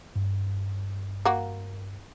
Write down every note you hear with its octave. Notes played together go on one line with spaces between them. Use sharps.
G2
A#3 F#4